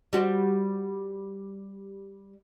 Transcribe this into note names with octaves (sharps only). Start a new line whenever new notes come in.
G3 F#4 C5